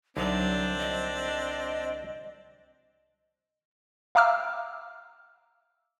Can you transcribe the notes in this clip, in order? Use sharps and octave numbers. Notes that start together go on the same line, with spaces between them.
C2 D3 F#3 C4 D4 D#4
D#5
E5 F5 A#5 D6 E6 F6